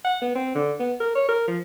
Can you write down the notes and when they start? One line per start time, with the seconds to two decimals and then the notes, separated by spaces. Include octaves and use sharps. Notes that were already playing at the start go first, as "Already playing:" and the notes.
0.05 F#5
0.22 B3
0.35 C4
0.55 D3
0.80 B3
1.00 A#4
1.15 C#5
1.29 A#4
1.48 F3